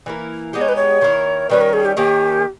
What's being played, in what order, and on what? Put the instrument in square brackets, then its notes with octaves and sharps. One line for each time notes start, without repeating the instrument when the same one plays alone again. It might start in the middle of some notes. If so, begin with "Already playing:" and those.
[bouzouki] E3 A#3 E4 A#4
[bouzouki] G#3 B3 D#4 G4 [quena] D#5
[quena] C#5
B4
C#5
[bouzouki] D#3 A#3 E4 A#4
[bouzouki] D#3 G3 C#4 [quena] B4
[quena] A#4
G#4
G4
[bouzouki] D#3 A#3 C#4 [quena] G4